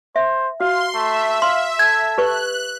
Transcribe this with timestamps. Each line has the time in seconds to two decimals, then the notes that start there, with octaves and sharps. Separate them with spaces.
0.16 C5 E5
0.60 F#4 F5 C6
0.94 A3 E5
1.42 F5 C6
1.79 A4 G#6
2.18 G4 B4 C#6 F#6